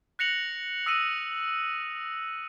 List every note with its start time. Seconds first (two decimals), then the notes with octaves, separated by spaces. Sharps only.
0.19 F#6 A#6 C#7 F7 F#7
0.86 D#6 E6 A#6 C#7 D#7